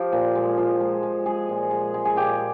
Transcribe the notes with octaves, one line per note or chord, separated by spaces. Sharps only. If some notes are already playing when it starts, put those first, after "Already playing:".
Already playing: F3 G4
A#2
G#3
F3
G#3
G#3
G#3 G#4
A#2
G#3
G#3
G#4
A#2 G4